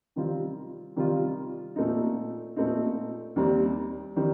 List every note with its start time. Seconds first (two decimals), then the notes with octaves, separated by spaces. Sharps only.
0.16 C3 D#3 G3 C4 F4
0.96 C3 D#3 G3 C4 F4
1.76 A#2 A3 C4 D#4
2.56 A#2 A3 C4 D#4
3.36 D#2 D#3 G3 C4
4.16 D#3 G3 C4